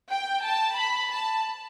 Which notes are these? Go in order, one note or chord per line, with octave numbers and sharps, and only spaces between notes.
G5
A5
B5
A5